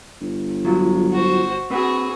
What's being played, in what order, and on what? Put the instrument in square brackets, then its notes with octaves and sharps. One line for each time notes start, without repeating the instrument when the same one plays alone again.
[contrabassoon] G1
[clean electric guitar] F#3 F4
[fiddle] F#4 C5
[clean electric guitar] C4 B4 [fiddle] F#4 G#4